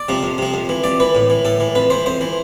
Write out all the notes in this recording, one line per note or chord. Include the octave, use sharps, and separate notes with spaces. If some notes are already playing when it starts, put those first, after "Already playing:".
Already playing: D5
C3 F3
F2
C3 F3
F2
E3
F2 D5
E3 B4
A2
E3
A2 A4
E3
F2 B4
E3 C5
F2 C5
E3